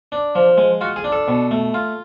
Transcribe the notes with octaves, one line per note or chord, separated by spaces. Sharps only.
D4
F3
G#3
F4 F#4
G#4
D4
A4
B2
A3
F4